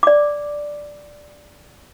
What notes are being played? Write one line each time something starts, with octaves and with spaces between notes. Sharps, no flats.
D5 D6